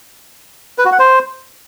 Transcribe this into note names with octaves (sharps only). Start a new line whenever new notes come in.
B4
F#4
F#5
C5